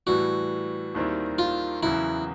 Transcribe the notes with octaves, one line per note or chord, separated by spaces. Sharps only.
A2 E3 G3 F#4
D#2 D#3 G3 C4 E4
F4
E2 C#3 F#3 E4